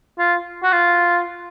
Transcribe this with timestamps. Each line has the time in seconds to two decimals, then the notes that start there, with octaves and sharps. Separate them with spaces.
0.18 F4
0.63 F#4
0.72 F4